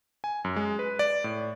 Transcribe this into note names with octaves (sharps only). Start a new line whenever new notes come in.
G#5
F#2
G#3
B4
D5
A2